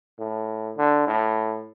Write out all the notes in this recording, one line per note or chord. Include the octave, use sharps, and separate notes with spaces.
A2
D3
A2